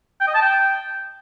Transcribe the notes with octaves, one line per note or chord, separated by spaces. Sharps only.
G5
D#5
A5
G5